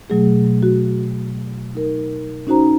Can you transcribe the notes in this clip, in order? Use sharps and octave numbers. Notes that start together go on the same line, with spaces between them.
B2 F#3 A3 G#4
F#4
D#4 A#4
C#4 D#4 F#4 C5 A#5